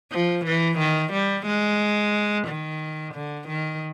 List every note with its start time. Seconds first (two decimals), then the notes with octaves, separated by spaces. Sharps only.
0.12 F3
0.45 E3
0.78 D#3
1.13 G3
1.46 G#3
2.47 D#3
3.14 D3
3.48 D#3